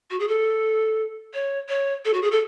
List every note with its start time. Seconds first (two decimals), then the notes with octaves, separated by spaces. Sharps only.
0.10 F#4
0.19 G#4
0.28 A4
1.34 C#5
1.69 C#5
2.05 A4
2.13 F#4
2.22 G#4
2.31 A4